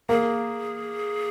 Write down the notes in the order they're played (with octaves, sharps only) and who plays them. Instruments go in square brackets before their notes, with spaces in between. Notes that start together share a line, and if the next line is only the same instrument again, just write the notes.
[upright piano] A#3 [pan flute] G#4